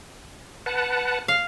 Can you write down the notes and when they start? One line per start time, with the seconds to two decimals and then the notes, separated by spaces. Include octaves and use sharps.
0.66 B4 F#5 A5
1.28 F5